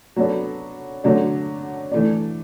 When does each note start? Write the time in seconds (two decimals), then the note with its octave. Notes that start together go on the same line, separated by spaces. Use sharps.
0.16 F#3 B3 D4 A4
1.04 D3 F#3 A3 D4
1.92 E3 A3 D4